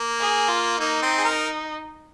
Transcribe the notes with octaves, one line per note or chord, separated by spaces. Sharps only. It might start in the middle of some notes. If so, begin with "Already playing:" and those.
Already playing: A#3
G#4
F4
A#3 D#4
C4
G#4
A#4